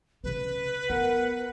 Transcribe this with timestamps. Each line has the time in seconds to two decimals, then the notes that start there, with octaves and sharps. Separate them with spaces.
0.24 C#3 C#4 B4
0.90 B3 A#4 F#5